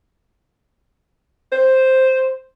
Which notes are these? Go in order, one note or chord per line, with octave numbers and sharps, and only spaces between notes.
C5